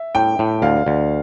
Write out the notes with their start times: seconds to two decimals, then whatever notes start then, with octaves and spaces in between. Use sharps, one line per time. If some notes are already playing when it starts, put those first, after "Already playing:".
Already playing: E5
0.15 A2 G5
0.39 A2
0.62 D2 F5
0.86 D2